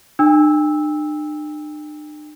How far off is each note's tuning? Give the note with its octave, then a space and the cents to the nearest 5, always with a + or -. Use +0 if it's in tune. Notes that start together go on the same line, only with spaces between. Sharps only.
D4 +45 G5 +40 E6 -10